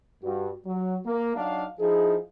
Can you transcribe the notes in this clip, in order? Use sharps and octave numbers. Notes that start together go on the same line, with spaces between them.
G2 F#4
F#3
A#3
F#3 D4 D#4 F5
F3 D#4 E4 G#4